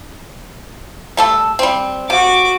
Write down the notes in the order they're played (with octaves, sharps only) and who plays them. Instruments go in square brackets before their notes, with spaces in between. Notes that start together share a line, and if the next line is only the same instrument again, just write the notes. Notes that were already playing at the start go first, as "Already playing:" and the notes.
[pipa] G3 A3 A4
G3 C4
[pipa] C3 [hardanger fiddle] F#4 D6